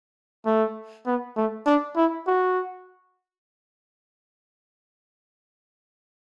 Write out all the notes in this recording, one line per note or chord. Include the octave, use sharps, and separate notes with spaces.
A3
B3
A3
D4
E4
F#4